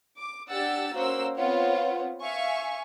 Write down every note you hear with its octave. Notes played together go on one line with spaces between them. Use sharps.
D6
D4 G4 F#5 E6 A6
A#3 C#4 F#4 C5 E6
B3 C4 F4 C#5 F#5
E5 F5 G#5 C#6